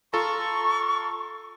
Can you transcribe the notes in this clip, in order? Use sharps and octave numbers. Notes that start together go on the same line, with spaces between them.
F4 A4 A#5 C#6